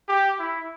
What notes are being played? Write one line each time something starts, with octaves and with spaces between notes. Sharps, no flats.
G4
E4